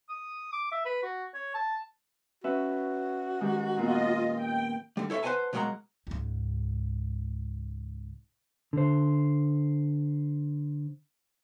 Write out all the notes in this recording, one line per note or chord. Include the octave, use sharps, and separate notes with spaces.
D#6
D6
E5
B4
F#4
C#5
A5
C#4 F#4 B4 E5
D#3 G#3 G4
A#2 A#3 B3 F4 D#5
G5
D3 G3
E4 A4 C#5 D5 E5
B4 C5 E5 F#5 G#5 A5
B2 F#3 G#3 A#3 F#5 A#5
C#2 G#2
D3 C5